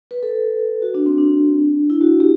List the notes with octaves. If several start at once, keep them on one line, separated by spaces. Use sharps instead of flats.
B4
A4
F#4
D4
C4
D4
E4
F#4
G4